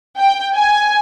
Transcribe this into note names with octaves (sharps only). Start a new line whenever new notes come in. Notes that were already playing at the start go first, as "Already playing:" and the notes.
G5
G#5